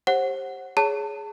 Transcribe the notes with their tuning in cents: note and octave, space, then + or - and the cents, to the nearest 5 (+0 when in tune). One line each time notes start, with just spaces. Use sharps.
G4 +0 C5 +35 F#5 +0
G#4 +5 C#5 +15 A5 +30